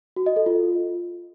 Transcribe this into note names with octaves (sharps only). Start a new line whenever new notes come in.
F#4
D#5
A4
F4